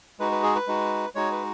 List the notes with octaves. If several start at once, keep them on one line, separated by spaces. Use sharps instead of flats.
G#3 D#4 F#4 B4
B4
G#4
B4
G#3 D#4 F#4
G#3 D#4 F#4 C#5
B4